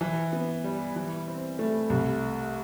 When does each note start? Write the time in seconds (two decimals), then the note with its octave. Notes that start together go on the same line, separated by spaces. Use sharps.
0.01 E3
0.33 B3
0.64 G3
0.96 E3
1.28 C4
1.59 A3
1.90 C2